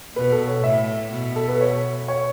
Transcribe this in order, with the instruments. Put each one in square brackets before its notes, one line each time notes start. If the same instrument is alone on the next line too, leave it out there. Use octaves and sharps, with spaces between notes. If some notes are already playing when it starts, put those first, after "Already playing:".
[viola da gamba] B2 [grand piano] B4
[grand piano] A4
C#5
[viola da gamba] A2 [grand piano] E5
[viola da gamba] B2
[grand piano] A4
B4
C#5
C#5